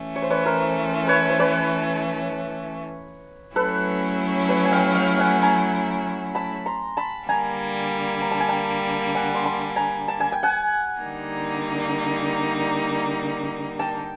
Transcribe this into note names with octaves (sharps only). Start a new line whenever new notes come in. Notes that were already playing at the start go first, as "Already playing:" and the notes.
Already playing: E3 A3 C#4
C#5
C5
B4 C#5
A#4 C5
B4 C#5
C5
B4 C#5
F#3 A3 C#4 E4 A4 B4
B4 C#5
G#5
F5 G5
F5 G5
F#5 G#5
G#5 A#5
A5 B5
A#5 C6
A5 B5
D3 G3 A#3 G#5 A#5
A#5
A5
G#5
G5 A5
F#5 G#5
C6
A5 B5
G#5 A#5
A5
G#5
G5
F#5 G#5
D3 G3 A#3 D#4
G5 A5